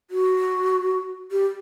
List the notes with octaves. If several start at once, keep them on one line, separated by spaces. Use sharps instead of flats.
F#4
G4